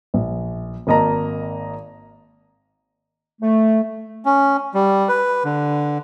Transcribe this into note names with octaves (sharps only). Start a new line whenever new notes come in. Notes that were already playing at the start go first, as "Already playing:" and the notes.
A#1
G#1 A#3 D#5 A5 A#5
A3
C#4
G3
B4
D3